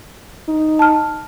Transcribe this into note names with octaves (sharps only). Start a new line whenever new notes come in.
D#4
A5 F6